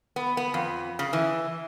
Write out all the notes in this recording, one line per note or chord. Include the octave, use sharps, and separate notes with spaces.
B3
B3
F2
C#3
E3